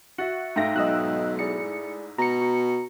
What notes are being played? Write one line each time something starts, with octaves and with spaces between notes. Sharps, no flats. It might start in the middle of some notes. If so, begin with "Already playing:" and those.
F#4 E5 A6 C#7
G#2 A3 E5 F5 G5 A#6
B1 D#5 E6 F#6
E4 G#4 D5 C#7
B2 A#5 C#7
F#4